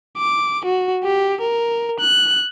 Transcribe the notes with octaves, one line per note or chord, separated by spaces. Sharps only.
D6
F#4
G4
A#4
F#6